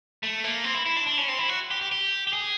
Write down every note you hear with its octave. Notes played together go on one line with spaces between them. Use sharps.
A3
A#3
C4
E4
E4
D4
D4
C#4
C4
E4
F#4
G4
G4
G4
G4
G#4